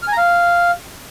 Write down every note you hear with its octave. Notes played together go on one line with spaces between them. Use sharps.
F6
G#5
A#5
F5